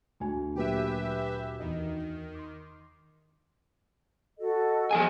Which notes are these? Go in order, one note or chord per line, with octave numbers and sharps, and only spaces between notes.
D2 G#5
A#2 F#3 A#3 G4 B4 E5
E2 D#3 D#5
C6 D6
F#4 A4 D#5
F3 G#4 G#5